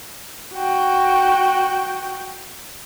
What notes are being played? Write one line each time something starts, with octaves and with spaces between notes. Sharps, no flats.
F#4 G5